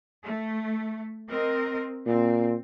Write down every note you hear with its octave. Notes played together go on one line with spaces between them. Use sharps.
A3
C4 A#4 D#5
A#2 C4